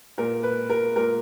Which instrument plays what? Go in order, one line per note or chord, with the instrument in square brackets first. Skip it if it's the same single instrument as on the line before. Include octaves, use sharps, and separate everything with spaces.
[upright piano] A#2 A#4
B4
A#4
A#2 A#4